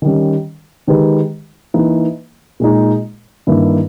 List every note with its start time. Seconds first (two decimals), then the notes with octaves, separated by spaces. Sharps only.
0.02 D#3 G3 C#4
0.87 D#3 G#3 D#4 G4 B4
1.74 E3 A#3 D#4
2.60 A#2 G#3 D#4
3.47 G2 D#3 A#3 E4